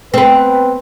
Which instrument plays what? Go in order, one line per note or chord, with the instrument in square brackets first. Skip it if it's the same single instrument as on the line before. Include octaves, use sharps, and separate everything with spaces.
[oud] B3 C4 [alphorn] B4